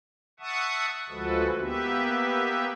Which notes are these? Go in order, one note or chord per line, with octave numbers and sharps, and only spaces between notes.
E5 F#5 A5 C#6 D#6
D2 F3 G#3 F#4 A4 B4
A#3 B3 G4 B4 E5